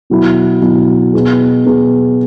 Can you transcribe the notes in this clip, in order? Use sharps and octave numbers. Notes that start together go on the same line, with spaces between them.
B2 F#3 E4
B2 F#3 E4
B2 B3 G#4
B2 B3 G#4